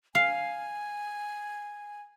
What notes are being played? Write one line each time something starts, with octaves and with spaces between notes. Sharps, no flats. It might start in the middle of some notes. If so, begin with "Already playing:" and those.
F5 G#5